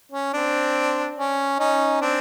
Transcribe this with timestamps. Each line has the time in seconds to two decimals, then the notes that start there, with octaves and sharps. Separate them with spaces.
0.12 C#4
0.33 C4 D4
1.17 C#4
1.59 C#4 D#4
2.01 C4 D4